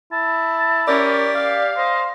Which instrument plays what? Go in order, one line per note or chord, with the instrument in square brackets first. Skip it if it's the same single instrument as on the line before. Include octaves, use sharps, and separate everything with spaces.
[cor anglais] E4 [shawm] A5
[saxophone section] C#4 A#4 [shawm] G4 [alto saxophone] D5
[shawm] G4 [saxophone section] F5
[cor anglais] C5 [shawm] D#5